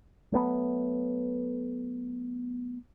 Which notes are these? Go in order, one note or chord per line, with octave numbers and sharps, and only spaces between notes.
F#3 A3 B3